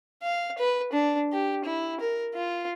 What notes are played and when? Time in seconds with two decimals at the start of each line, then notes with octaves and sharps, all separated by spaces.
0.23 F5
0.58 B4
0.93 D4
1.33 G4
1.65 E4
2.00 A#4
2.35 F4